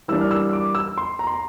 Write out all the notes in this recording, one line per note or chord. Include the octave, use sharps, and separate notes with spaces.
E3 G3 A#3 D4 E6
F6
E6
D6
E6
C6
A#5
C6
A#5